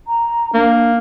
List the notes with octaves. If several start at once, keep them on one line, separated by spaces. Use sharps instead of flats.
A#5
A#3 D4